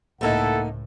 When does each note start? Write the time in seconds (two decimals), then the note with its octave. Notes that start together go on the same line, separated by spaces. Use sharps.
0.21 C#2 A2 A3 A#3 D#4 E4 A4 F#5